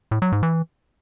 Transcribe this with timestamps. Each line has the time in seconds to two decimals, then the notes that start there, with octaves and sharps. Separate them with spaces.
0.11 A2
0.22 F#3
0.32 G#2
0.43 E3